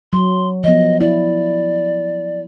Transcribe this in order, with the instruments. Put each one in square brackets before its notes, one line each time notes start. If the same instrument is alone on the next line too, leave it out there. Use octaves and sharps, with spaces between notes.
[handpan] F#3 [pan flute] C6
[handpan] F3 B3 [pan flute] D#5
[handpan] E4 [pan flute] D5